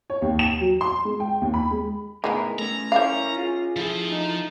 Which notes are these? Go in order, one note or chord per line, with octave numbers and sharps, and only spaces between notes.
C#5
D#2
E7
F#3
C6
G#3
G5
D#2
B5
G#3
A2 D#3 G#3 B3 E4 A#4
A3 C#4 A#5
C#4 E4 A#4 C5 D5 F5
F4 G#4
F3 E4 G#4 A4
D#4